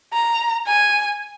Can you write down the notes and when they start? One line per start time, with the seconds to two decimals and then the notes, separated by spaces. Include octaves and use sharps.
0.13 A#5
0.67 G#5